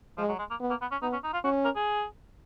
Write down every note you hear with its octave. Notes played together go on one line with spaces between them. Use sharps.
F3 G#3
F#3
G#3
A#3
B3
A#3
B3
C#4
B3 D#4
C#4
D#4
F4
C#4 F#4
A#4
G#4